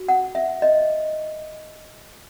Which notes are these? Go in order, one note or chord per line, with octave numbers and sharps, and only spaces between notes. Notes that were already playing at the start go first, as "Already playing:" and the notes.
Already playing: F#4
F#5
E5
D#5